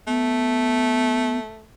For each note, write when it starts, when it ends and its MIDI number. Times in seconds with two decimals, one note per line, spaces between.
0.07 1.71 57
0.07 1.38 59